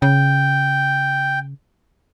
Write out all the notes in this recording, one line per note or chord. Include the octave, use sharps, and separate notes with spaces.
C#3 G5